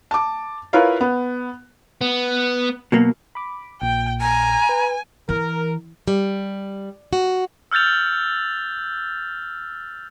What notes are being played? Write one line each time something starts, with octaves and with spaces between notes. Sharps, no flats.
A5 D6
E4 F4 A#4 B4 C#5 F5
B3
B3
B2 F#3 A#3
B5 D6
A#1 A#2 G5
G#5 A#5
B4
E3 A#4
G3
F#4
E6 F6 G6 A6 F7